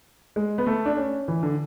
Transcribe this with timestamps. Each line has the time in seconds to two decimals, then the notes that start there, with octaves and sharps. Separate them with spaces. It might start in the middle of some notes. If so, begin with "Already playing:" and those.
0.36 G#3
0.58 B3
0.67 A3
0.86 D4
0.97 C#4
1.28 E3
1.43 D3